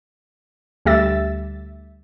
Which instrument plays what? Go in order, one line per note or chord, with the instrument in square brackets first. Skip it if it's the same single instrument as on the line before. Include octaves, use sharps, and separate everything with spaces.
[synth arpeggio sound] D2 G3 G4 E5 E6 A6